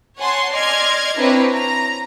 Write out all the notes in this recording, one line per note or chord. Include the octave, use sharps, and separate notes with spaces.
C#5 F#5 G#5 A5 C6
D5 D#5 C6 F6 G#6
C4 D4 E4 B4 C#5 A#5
A#5